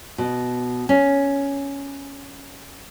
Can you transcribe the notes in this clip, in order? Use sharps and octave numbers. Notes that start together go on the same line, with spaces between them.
B2
C#4